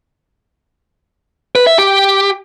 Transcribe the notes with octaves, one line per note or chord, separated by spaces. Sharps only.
B4
E5
G4